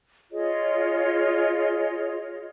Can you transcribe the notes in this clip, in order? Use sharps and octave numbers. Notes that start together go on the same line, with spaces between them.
F4 G#4 C#5 D#5